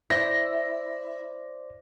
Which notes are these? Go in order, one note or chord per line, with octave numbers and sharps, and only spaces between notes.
E4 C5 D5 A#6